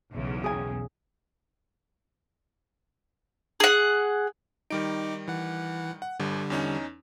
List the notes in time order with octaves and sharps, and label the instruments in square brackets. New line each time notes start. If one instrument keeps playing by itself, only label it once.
[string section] B1 E2 C#3
[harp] G#4 G#5
[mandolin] G#4 F#5
[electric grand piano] D#3 G3 D7 [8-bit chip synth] D#4 D6
[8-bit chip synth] E3 F#5
[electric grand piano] F#5
[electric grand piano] G1 [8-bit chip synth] D3 G3
[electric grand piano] E2 C#4 D#4